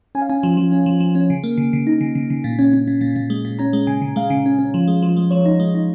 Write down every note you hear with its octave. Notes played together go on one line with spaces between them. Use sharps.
C#4 G#5
F5
C#4 G#5
F3
F3
C#4
F3
F3
C#4
C#3
A#3
C#3
C#3
D#4
C#3
C#3
C#3
A#2
C#4
C#4
A#2
A#2
A#2
G#3
A#2
C#4 A#5
G#3
C#3 G#5
C#3
G#3 F5
C#3
C#4
C#4
F3
G#3
F3
G#3
F3 C#5
D#4
G#3
D#4